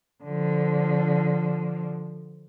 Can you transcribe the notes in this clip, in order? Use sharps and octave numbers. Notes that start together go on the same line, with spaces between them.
D3 F3